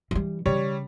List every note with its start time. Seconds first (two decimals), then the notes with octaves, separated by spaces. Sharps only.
0.11 E3 G3
0.46 C#3 G3 C#5